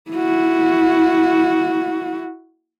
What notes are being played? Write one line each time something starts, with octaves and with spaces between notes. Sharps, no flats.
E4 F#4